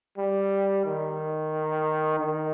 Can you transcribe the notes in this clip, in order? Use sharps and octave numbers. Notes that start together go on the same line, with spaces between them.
G3
D#3
D#3